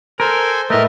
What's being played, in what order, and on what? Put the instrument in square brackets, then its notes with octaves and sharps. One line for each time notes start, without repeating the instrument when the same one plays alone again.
[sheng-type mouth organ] A4 C5 G#5 [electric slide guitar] A#4
[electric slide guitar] A2 A3 [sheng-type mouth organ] A#4 B4 D#5